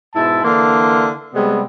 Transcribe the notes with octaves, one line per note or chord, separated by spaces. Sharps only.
G#2 B2 E4 A5
D3 E3 A#3 D4 C6
C3 G3 G#3 B3